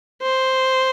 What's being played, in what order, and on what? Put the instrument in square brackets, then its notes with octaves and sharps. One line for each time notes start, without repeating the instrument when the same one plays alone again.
[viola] C5